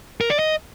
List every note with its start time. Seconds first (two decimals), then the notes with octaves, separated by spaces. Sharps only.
0.21 A#4
0.30 D5
0.39 D#5